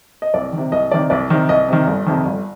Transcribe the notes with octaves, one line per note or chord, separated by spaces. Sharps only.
D#5
C2 D5
C3 D#3
C2 D#5
C3 D#3 D5
C2 D5
C3 D#3
C2 D#5
C3 D#3
G1
F2 C3 D#3
G1